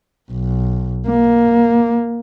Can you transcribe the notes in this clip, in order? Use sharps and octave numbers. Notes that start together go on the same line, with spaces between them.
B1
A#3